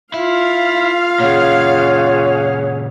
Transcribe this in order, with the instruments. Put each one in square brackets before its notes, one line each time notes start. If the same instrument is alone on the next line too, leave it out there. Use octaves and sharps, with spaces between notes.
[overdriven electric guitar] E4 [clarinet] F4 [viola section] F5
[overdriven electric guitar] A#2 C#3 [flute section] G#4 C#5 F#5